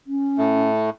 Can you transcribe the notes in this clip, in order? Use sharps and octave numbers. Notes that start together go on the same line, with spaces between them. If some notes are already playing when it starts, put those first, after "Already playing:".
C#4
A2 A3